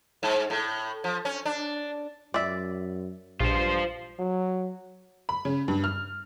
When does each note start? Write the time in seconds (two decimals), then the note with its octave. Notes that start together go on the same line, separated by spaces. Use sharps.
0.23 G#2
0.50 A2
1.04 F3
1.25 C#4
1.46 D4
2.34 F#2 D5 E5
3.40 A#1 G2 F4 C5
4.19 F#3
5.29 B5
5.45 C#3
5.68 G2
5.84 F6